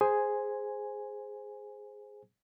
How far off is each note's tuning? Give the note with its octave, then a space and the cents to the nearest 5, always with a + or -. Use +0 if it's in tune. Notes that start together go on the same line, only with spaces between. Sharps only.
G#4 +0 C5 +0 G#5 +0